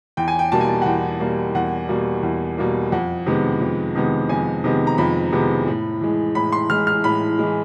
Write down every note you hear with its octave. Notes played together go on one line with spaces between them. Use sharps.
E2 G5
G#5
G5
B2 G3 A#3 A5
G#5
A5
F#5
E2 G5
B2 G3 A#3
E2 F#5
B2 G3 A#3
E2
B2 G3 A#3
F2 F#5
C3 D#3 G#3 B3
F2
C3 D#3 G#3 B3
F2 G#5
C3 D#3 G#3 B3
A#5
F2 B5
C3 D#3 G#3 B3
A2
E3 G#3
A2 B5
C6
E3 G#3 F6
F6
A2 B5
E3 G#3